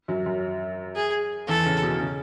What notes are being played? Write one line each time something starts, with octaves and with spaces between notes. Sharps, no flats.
F#2 F#3
F#2 F#3
G#4
E2 E3 A4
C#3
B2
C#3